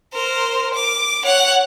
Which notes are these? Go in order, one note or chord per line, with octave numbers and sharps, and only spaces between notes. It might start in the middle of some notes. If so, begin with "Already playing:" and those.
A#4 C5
D6
C#5 F#5